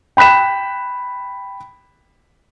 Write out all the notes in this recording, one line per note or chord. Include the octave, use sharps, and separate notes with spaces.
G5 B5 F#6 B6 E7